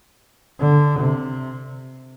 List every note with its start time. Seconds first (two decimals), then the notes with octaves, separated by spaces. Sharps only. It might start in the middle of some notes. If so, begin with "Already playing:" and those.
0.60 D3
1.00 C3